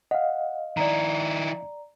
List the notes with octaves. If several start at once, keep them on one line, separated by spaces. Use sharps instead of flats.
D#5 F5 F#5
D#3 E4 D5 A#5